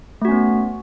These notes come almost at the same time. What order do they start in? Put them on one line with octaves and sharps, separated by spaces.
A3 F#4 C#4 B3